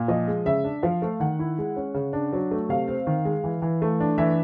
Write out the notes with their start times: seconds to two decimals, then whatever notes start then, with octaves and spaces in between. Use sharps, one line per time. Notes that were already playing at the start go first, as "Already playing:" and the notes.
Already playing: A#2
0.08 F3 D#5
0.27 G#3
0.46 C#3 E5
0.64 D4
0.83 F3 F5
1.02 A3
1.20 D#3 F#5
1.39 E4
1.58 G#3
1.76 C#4
1.94 C#3
2.13 D4
2.33 F#3
2.51 A3
2.69 C3 F5
2.88 C4
3.07 D#3
3.25 G#3
3.44 E3
3.62 E3
3.82 A3
4.00 D4
4.18 E3 E5